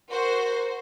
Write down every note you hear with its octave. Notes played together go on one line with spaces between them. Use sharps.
F#4 A#4 C5